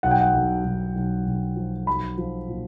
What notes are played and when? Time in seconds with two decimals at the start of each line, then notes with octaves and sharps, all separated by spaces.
0.03 B1 F#5
0.11 G5
0.19 F#5
0.34 B1
0.64 B1
0.95 B1
1.26 B1
1.56 F3
1.87 B1 B5
2.18 F3
2.49 A#2